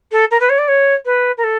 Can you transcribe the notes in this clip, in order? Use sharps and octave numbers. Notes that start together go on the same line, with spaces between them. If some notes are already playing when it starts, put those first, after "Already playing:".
A4
A#4
B4
C#5
D5
C#5
B4
A#4
A4